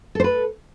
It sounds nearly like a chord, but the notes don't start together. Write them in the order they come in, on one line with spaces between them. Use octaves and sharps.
A4 C5 B4